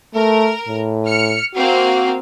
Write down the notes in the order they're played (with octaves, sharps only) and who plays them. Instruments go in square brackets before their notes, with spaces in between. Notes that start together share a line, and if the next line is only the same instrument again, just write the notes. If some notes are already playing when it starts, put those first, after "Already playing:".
[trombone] A3 [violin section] A#4
[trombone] A2
[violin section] F6 C#7
[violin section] A#3 C4 F5 [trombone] F#4